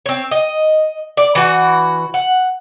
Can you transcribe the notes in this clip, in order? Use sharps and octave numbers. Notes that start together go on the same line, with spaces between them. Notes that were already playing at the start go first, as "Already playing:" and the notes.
C4 C#5
D#5
D5
E3 F#4
F#5